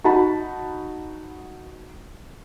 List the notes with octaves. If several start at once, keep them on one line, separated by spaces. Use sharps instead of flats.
D#4 F#4 A5 B5